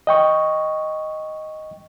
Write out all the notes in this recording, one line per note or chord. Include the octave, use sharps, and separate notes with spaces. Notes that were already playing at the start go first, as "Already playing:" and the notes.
D#5 G5 C#6